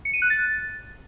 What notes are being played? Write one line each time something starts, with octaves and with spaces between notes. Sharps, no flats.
C#7
D#7
F#6
A6